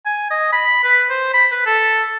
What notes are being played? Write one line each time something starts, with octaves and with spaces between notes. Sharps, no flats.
G#5
D#5
B5
B4
C5
B5
B4
A4